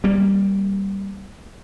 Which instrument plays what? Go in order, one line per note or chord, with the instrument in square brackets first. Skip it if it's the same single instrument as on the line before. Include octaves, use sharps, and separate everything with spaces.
[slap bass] G3 A#3